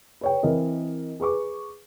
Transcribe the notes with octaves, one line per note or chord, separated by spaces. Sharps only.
B4 C#5 G5
E3 C4 A#4 D#5
G#4 B4 C#6 D6